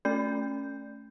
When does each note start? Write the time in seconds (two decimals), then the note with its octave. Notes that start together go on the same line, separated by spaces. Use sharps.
0.05 A3 C#4 D5 G6